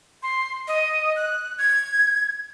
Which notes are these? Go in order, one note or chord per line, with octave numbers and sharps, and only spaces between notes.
C6
D#5
F#6
G#6